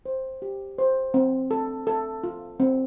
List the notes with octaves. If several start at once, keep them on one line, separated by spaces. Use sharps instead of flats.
C5
G4
C5
C4
A4
A4
F4
C4